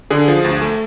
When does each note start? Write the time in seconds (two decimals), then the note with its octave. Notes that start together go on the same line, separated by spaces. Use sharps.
0.10 D3 G#4
0.28 F3
0.44 D2
0.61 A3